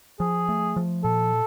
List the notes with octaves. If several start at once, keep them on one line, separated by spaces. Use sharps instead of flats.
F3 G#4
A3
F3
A#2 A4